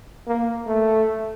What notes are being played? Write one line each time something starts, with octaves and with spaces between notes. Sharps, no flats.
A#3
A3